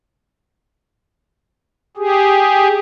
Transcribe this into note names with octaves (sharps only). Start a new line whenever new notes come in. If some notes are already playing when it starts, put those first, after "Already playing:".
G4 G#4